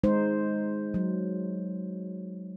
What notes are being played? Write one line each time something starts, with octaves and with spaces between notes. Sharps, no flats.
G#3 D#4 C5
F#3